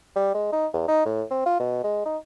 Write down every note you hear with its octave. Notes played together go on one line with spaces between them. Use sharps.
G3
G#3
D#4
E2
D#4
A2
C4
F4
B2
G#3
D#4